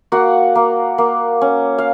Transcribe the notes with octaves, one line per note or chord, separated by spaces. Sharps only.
A#3 F#4 F#5
A#3
A#3
C#4
F5